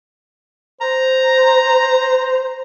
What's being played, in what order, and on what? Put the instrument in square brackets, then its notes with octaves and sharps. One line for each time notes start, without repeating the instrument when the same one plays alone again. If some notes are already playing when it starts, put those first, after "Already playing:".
[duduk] C5 [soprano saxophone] A#5